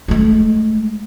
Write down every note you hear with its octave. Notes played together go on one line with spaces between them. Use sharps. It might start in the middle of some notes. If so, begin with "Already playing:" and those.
G#3 A3